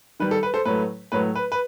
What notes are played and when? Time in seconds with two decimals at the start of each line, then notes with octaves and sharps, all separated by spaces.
0.20 D#3 G3 B4
0.31 A4
0.43 B4
0.54 A4 C5
0.65 A2 F#3 A3 B4
1.12 A2 F#3 A3 B4
1.35 B4
1.52 B4